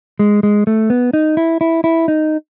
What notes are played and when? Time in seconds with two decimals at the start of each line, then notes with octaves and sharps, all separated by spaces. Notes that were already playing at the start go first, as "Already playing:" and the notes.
0.19 G#3
0.43 G#3
0.67 A3
0.90 B3
1.13 D#4
1.37 E4
1.61 E4
1.84 E4
2.08 D#4